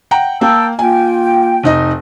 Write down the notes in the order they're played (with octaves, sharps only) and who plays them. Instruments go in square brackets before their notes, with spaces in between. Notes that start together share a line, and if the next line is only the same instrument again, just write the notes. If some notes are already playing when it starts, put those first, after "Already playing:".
[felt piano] F#5 G5 A#5
[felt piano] A#3 [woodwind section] G5 A5 E6
[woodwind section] A#3 F4 G5 [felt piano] G#5
[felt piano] F1 D#4 D#5